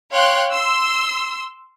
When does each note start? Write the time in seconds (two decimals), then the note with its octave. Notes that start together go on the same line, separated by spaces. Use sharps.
0.13 C#5 F5 G5 C6 F#6
0.52 C6 E6